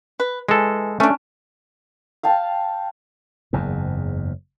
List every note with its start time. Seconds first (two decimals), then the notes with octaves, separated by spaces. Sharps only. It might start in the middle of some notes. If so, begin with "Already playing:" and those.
0.20 B4
0.48 E3 G#3 A4
1.00 A3 C#4 D4
2.23 F5 G5 A5
3.53 F#1 E2 G#2